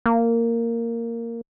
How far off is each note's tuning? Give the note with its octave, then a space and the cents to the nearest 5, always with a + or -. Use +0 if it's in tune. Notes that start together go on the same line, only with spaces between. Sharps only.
A#3 -10